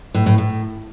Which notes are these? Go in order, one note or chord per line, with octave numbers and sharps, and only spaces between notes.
A2
A2
A2